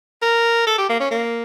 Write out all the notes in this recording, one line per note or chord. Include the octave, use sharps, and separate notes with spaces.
A#4
A4
G4
A#3
C#4
A#3